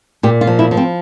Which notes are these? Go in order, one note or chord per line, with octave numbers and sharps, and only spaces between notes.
A#2 G4
F4
F3
E4
F3
C4